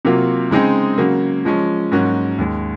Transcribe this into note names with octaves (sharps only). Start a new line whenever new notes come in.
C3 F#3 A#3 F4
C#3 G#3 C4 D#4 G#4
C#3 F#3 A#3
F3 G#3 C#4
G#2 F#3 A#3 C#4 F#4
D#2 D#3 G#3